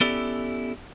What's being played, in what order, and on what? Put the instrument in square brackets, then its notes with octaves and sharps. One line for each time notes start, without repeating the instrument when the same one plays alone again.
[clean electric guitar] B3 C#4 E4 G4 A4 D5